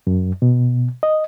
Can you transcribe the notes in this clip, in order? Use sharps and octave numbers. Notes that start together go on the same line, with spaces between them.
F#2
B2
D#5